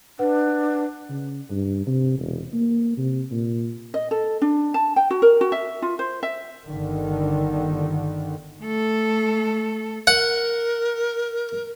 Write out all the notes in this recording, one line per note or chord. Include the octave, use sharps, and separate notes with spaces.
D4 B4 F#5
C#3
G2
C3
E1
A#3
C3
A#2
D#5
A4
D4
A5
G5
F#4
A#4
F#4
E5
F4
C5
E5
G1 D3 D#3
A3 A4
A#4 F#5